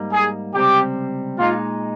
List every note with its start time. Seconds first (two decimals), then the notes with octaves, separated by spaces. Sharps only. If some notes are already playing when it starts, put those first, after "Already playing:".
Already playing: G#2 G3 A#3 D#4
0.12 G#4
0.54 C#2 C3 G3 C4 G4
1.39 A#2 G#3 D#4 F4